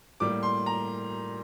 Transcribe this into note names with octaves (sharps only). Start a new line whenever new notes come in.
A2 G3 A#3 D6
C6
A#5